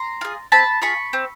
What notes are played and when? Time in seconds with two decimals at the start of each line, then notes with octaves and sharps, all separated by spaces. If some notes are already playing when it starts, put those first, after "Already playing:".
Already playing: A#5 C6
0.21 F4 G#4
0.52 C4 A5 B5
0.82 F4 G#4 B5 C#6
1.13 C4